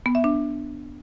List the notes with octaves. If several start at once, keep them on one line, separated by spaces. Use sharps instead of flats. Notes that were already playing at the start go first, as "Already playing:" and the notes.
B3
E5
D4